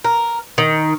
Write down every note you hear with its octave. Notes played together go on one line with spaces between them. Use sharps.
A#4
D#3